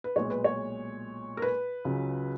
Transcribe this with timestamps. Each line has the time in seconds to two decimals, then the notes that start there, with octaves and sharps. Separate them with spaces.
0.04 B4
0.15 B1 A#2 G#3 C#5
0.30 B4
0.44 C#5
1.37 A#4
1.42 B4
1.85 C#2 C#3 F#3